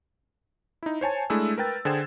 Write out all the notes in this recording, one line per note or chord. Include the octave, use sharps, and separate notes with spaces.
D#4 E4
C5 C#5 G#5 A5
G#3 A3 D4 E4 G#4 E6
A#4 B4 G5 A6
D3 G#4 C5 G5 G#6 E7